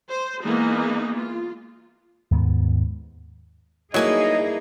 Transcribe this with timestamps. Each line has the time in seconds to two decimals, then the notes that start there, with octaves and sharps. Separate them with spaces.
0.11 C5
0.44 E3 G#3 A#3 B3 D#4
1.15 F4
2.31 D#2 G#2 B3
3.94 G2 F#3 A#3 D#4 E4 G#4 D#5 G#5